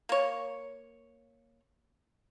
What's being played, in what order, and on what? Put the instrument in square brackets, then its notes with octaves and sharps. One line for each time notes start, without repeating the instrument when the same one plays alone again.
[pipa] A#3 C#5